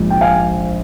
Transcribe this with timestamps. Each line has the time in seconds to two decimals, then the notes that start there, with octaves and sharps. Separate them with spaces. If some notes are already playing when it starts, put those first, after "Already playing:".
Already playing: A#1 G#2 F3
0.10 G5
0.21 F5 G#5